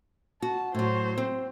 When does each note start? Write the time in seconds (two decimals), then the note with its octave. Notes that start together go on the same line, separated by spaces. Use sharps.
0.42 F#4 A5
0.75 A2 F#3 C5
1.18 C4